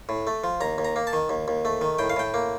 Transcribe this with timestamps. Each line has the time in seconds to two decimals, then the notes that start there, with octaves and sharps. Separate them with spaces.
0.09 A2
0.27 A3
0.44 F3
0.61 D#2 A#5
0.78 D#2
0.85 A#5
0.96 A#3
1.07 A5
1.13 D#3
1.29 D#2
1.48 D#2
1.65 A3
1.81 D#3
1.99 A2 G5
2.10 F5
2.16 A2 G5
2.34 A#3